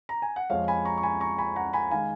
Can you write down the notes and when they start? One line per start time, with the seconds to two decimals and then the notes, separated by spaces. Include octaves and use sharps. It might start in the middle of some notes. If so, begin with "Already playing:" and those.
0.09 A#5
0.22 G#5
0.36 F#5
0.50 F2 F3 G#3 C#5 F5
0.68 G#5 B5
0.85 A#5 C#6
0.98 C#6
1.03 G#5 B5
1.20 A#5 C#6
1.38 G#5 B5
1.56 F#5 A#5
1.73 G#5 B5
1.91 D#3 G#3 F5 G#5